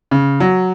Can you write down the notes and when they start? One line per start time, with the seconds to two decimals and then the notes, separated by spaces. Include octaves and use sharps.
0.11 C#3
0.40 F#3